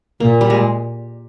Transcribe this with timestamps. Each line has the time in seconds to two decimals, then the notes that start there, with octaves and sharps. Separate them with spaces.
0.20 A#2 A#3
0.41 G3
0.50 G#3